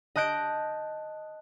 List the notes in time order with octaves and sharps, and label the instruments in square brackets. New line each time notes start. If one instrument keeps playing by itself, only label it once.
[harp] D#5 A5 F#6 G6 D7